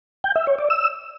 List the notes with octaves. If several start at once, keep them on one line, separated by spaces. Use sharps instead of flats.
G5
E5
C#5
D5
E6